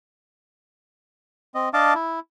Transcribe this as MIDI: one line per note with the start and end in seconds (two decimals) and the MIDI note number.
1.55 1.69 60
1.55 1.69 75
1.74 1.94 62
1.74 1.94 75
1.74 1.94 77
1.74 1.94 81
1.74 1.94 86
1.95 2.20 64